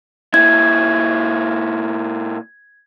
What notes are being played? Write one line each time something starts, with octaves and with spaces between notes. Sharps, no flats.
A#2 E4 G#6